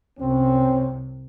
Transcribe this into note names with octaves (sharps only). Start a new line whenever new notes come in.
C2 F#2 C3 C4 C#4